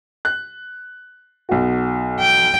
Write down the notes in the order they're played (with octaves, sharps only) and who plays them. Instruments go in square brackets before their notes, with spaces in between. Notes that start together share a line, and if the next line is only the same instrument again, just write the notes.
[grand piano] F#6
B1 F#4
[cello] G5